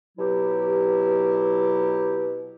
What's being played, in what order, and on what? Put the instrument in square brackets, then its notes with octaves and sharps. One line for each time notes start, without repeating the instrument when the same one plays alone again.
[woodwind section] B2 F#3 E4 G4